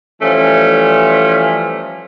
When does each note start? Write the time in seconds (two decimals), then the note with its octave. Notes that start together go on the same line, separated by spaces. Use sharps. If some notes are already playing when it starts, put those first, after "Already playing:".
0.21 E3 F3 G3 A3 C#4